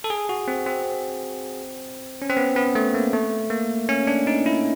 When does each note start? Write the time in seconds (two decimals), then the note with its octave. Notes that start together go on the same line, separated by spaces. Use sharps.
0.04 A4
0.10 G#4
0.29 F#4
0.48 C4
0.66 C4
2.22 C#4
2.29 C4
2.37 B3
2.56 B3
2.75 A3
2.94 A#3
3.13 A3
3.50 A#3
3.89 C#4
4.07 D4
4.27 D#4
4.46 E4